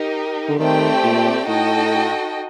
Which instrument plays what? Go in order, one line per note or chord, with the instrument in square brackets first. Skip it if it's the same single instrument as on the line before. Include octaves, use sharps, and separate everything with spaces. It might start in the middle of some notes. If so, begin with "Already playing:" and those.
Already playing: [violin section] D#4 G4 A#4
[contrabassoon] D3
[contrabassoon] D#3 [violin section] A3 C4 G4 D5 G5
[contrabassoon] A#2
[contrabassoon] A2 [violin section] D#4 F#4 A4 D#5 G5